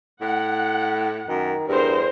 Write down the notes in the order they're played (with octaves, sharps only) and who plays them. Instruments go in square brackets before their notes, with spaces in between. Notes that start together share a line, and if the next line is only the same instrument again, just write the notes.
[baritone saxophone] A2 [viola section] F#5
[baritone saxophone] F#2 [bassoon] D#3
[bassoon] E2 [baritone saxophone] G2 [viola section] A#4 C5